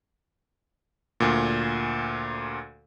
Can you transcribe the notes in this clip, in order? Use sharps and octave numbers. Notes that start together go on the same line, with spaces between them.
D2 A#2